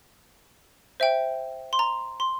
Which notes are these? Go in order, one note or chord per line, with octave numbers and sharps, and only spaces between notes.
C5 E5 G5
C6
A#5
C6